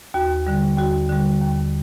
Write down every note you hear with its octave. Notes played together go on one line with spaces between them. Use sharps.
D#2 F#4
D3 G3
D#2 F#4
D3 G3
D#2